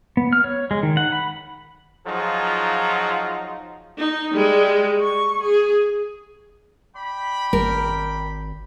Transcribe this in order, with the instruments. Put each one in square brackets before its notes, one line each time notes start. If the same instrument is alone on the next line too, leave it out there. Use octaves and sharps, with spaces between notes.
[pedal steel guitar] B3
F6
C#5
G#3
D#3
F#5
B5
[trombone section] F3 F#3 D#4 F4 G#4
[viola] D#4
G3 G#3
C#6
G#4
[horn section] D5 G5 B5
[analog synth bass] G#1 [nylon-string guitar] A#4